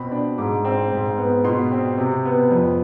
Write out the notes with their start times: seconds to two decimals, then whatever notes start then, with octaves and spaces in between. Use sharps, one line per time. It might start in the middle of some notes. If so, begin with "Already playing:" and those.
Already playing: B2 C4 B5
0.12 D4
0.38 G#2 D6
0.65 C4
0.92 G#2
1.18 B3
1.44 B2 C6
1.72 C4
1.98 C3
2.25 B3
2.51 F2